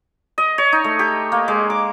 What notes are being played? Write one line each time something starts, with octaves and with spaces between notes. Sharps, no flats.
D#5
C#5
D#4
A3
G4
A#3
G#3
D6